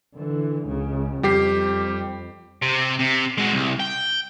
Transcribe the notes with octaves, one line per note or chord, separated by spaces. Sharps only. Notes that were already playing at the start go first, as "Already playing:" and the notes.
D3 E3
C#2 C#3
F2 G3 G4 C7
C3
C3
G#3 F#4
C2
G5